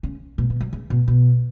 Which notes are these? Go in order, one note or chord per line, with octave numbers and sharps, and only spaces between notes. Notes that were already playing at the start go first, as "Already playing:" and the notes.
C#3
B2
B2
F#3
C#3
B2
B2